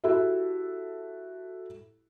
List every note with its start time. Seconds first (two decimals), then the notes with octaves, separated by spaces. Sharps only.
0.04 E4 F#4 G4 A4 E5